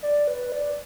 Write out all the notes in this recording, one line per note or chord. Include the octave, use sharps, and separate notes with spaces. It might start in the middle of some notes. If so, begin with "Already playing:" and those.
D5
B4
D5